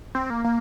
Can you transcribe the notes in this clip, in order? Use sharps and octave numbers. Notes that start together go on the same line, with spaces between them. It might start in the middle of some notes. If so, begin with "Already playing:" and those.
C4
A#3
A#3